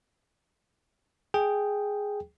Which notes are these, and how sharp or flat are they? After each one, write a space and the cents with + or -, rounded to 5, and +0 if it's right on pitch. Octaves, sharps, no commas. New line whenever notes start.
G#4 +0 G5 +0